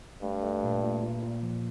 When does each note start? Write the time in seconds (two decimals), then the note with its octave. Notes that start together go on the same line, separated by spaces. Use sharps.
0.22 G2 A3
0.43 A3
0.63 A#2
0.83 A#2
1.02 A#2
1.23 A#2
1.43 F3